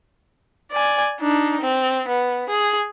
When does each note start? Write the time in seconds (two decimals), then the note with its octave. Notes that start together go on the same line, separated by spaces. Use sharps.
0.72 D5 G#5
1.20 D4 D#4
1.61 C4
2.08 B3
2.50 G#4